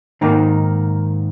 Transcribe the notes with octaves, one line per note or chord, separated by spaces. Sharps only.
G#2 D#3 A#3 D#4